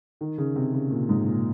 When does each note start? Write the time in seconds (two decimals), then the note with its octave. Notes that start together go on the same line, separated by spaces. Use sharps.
0.21 D#3
0.38 C#3
0.56 C3
0.73 C#3
0.91 A#2
1.09 G#2
1.26 A#2